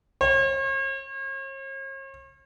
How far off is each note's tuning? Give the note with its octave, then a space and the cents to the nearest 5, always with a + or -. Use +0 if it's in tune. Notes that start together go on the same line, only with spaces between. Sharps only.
C#5 -45